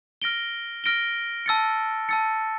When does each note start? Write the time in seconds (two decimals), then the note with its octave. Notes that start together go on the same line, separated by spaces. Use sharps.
0.22 F6 A#6 D7 G7
0.84 F6 A#6 D7 G7
1.46 A5 E6 A6 C#7
2.09 A5 E6 A6 C#7